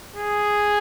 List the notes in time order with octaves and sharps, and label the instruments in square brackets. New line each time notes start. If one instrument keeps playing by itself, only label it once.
[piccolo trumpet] G#4